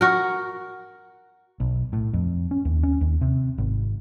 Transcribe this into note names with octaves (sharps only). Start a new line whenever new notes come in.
F#4 A#4
B1
A2
F2
C#4
D#2
C#4
D#2
C3
G#1